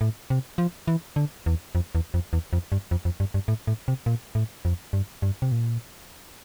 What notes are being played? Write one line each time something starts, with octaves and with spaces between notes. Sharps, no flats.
A2
C3
F3
E3
D3
E2
F2
E2
F2
E2
F2
G2
F2
F2
G2
G2
A2
A2
C3
A#2
A2
F2
G2
G2
C3
A#2